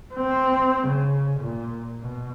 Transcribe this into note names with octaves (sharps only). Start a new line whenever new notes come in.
C4
C#3
A#2
B2